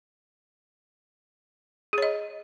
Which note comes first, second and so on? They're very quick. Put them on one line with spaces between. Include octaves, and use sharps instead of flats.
G#4 C#5 D#5